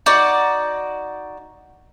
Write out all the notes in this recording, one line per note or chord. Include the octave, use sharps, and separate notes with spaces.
D#4 F#4 D5